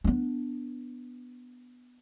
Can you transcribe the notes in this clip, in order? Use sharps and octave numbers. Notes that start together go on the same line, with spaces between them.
B3 D4